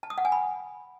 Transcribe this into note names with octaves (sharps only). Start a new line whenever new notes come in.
A5
D#6
F#5
G#5
B5